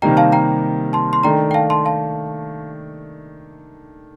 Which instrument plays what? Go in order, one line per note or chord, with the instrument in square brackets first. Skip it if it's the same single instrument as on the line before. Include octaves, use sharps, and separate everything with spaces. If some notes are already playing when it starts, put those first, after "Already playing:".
[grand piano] C3 D#3 G3 A#3 D#4 [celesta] G5 A#5
[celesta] F5 A5
G5 A#5
A5 C6
C6
[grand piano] D#3 A3 D4 [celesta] G5 A#5
[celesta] G5
F5 A5
A5 C6
F5 A5